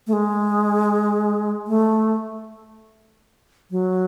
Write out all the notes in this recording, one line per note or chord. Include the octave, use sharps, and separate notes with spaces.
A3
G#3
A3
F#3